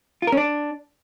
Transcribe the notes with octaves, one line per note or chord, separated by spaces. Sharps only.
F4
A#4
C#4
D4